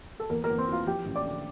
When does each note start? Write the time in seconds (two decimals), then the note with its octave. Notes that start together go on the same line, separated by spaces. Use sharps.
0.20 A4
0.30 E2 A#3 A#4
0.44 A#3 A#4
0.49 E2
0.58 C4 C5
0.68 E3 F4 F5
0.87 F3 G4 G5
1.06 A1
1.16 D5 D6
1.25 D3